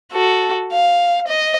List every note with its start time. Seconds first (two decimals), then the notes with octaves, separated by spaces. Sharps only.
0.13 F#4 A4
0.72 F5
1.28 D#5